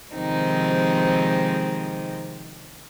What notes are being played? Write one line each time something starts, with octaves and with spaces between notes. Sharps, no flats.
C3 D#3 F3 G#3 C4 D#4